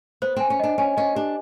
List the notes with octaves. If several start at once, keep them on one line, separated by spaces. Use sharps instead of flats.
B3 C5
C4 G#5
C#4
D4 D#5
C#4 G#5
C#4 D#5
D4 G4